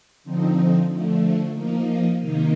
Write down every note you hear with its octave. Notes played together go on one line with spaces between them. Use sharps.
D3 F3 C4 D#4
D3 F3 A3
F3 A#3 D#4
C3 D#3 A#3 D#4